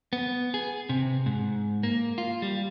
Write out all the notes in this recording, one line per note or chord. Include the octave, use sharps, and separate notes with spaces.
B3
G#4
C3
G#2
A#3
F4
G3